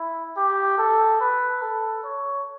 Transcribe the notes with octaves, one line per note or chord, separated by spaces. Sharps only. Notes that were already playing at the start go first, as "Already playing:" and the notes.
Already playing: E4
G4
A4
B4
A4
C#5